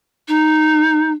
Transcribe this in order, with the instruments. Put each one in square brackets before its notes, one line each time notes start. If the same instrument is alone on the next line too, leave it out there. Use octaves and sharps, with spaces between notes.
[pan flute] D#4